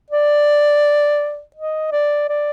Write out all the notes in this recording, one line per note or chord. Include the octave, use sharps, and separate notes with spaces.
D5
D#5
D5
D5